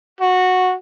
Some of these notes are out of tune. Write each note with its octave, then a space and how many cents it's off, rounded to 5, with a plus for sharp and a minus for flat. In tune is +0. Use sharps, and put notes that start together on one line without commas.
F#4 -10